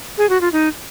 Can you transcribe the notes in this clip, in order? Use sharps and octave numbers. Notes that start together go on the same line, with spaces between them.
G#4
F#4
F4
D#4